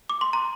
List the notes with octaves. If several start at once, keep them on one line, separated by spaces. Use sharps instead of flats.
D6
C6
A#5